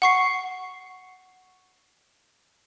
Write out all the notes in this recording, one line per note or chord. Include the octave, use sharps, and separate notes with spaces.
F#5 C#6 C7